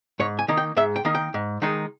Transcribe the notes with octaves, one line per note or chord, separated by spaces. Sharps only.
G#2 C#5
G#5
D#3 A#3 D#4
G5
G#2 E5
G5
D#3 A#3 D#4
G5
G#2
D#3 G#3 D#4